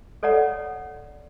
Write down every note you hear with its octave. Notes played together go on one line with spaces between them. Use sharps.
A4 C#5 D5 F#5 A#5